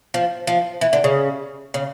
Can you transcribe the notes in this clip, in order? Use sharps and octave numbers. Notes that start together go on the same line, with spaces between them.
F3
F3
E3
D3
C#3
C#3